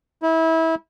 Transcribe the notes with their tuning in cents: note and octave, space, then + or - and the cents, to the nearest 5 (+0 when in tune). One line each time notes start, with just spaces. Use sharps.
E4 -25